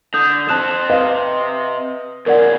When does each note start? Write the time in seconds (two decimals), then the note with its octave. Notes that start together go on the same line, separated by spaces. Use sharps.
0.14 D3 D#6 G6
0.49 F3 C4 A5 F#6 E7
0.90 C3 B4 D#5 F5
2.26 E2 C#3 A#4 D5 F#5